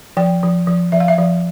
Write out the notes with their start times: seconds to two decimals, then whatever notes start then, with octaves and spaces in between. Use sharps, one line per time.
0.17 F3 G5
0.43 F3
0.67 F3
0.92 F3 E5
1.00 F5
1.08 E5
1.18 F3